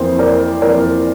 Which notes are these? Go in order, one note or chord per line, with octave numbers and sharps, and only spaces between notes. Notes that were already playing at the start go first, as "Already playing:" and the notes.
Already playing: F2 E3 A#3 C5
A#4 D5
F2 E3 A#3 A#4 D5